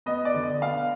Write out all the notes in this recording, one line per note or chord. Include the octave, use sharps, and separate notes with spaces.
B3 D#5
D5
D3
D#5
B3 F5